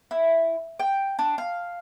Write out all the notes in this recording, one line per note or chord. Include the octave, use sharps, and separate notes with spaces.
E4
G5
D4
F5